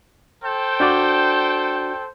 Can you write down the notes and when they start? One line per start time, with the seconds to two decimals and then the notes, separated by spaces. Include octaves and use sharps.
0.44 A4 C5 G5
0.80 D4 F#4 D5